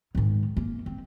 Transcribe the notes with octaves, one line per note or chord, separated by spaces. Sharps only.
G#2 D#3
A#3
C4